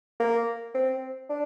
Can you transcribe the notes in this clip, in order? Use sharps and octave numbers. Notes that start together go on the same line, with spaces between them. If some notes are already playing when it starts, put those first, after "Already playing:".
A#3
C4
D4